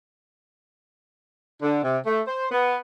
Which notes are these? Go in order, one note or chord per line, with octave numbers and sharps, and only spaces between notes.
D3
C3
A3
C5
B3